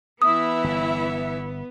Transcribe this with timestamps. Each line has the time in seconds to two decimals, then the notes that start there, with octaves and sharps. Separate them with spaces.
0.22 E3 B3 E4 E5 D#6
0.64 G1